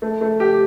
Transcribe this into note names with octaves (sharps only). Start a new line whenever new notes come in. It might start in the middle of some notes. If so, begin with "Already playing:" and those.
A3
A3
G4